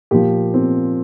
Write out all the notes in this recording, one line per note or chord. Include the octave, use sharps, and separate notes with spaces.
A#2 F3 G4
C4